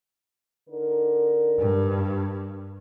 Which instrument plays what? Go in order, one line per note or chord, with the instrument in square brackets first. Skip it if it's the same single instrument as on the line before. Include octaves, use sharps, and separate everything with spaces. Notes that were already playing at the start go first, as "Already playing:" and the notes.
[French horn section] D3 D#4 A#4
[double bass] G2